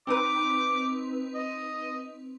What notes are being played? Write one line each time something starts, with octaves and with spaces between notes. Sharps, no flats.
C4 D#4 B4 D6
D#5